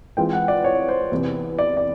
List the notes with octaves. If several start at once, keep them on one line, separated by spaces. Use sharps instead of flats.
E3 G#3 C4 F4 G5
F#5
D5
C#5
C5
E2 C3 E3
D5
D5